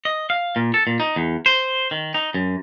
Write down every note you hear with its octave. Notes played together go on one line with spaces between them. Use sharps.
D#5
F5
A#2
A4
A#2
D#4
E2
C5
D#3
D#4
F#2